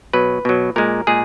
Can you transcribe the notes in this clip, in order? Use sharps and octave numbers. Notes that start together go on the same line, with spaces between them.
B2 F#3 B4
B2 F#3
A#2 G#3 A#4
A#2 G#3 G#4